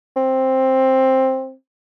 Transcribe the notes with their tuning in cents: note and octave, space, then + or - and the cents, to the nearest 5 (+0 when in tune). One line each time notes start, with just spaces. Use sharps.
C4 +10